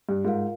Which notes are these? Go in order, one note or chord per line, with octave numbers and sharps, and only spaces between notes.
G2
G#2 F4 A#4 F5